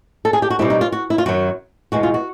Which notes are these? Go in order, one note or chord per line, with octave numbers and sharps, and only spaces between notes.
A4
G#4
G4
F#4
B2 G3 C4 E4
D#4
F4
F#4
E4
F4
F#2 D#3 F#3 F#4
E2 B2 G#3 B3 F#4
F4
F#4